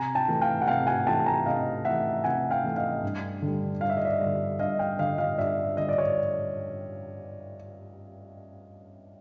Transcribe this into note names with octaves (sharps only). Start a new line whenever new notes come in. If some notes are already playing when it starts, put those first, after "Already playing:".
Already playing: C3 G#5 A#5
G5 A5
E3 A3
F5 G5
F#5
C3 F5 G5
F#5 G#5
E3 A3 G5 A5
G#5 A#5
C3 D#5 F5
E3 A3 E5 F#5
C3 F#5 G#5
F5 G5
E3 A3
D#5 F5
G2
D3 G3
G2 F5
E5
D#5
D5 E5
D3 G3
G2 D#5 F5
F5 G5
D3 G3 D#5 F5
D#5 F5
G2 D5 E5
D3 G3 D#5
D5
C#5